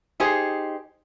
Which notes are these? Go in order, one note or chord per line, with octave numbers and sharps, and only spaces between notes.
D#4 G4 G#4 C5